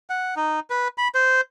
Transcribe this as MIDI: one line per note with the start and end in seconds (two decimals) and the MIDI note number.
0.10 0.35 78
0.36 0.60 63
0.70 0.88 71
0.98 1.08 83
1.15 1.41 72